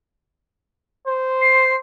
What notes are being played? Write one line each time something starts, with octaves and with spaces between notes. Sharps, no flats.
C5
C7